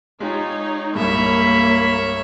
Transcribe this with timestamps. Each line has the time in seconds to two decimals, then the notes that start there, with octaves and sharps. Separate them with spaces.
0.20 G#3 D#4 F4 G4 C#5
0.95 C2 G2 G#3 A#3 C#5 E5 B5